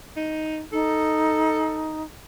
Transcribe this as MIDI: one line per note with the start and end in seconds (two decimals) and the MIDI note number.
0.16 0.62 63
0.72 2.03 63
0.72 1.97 69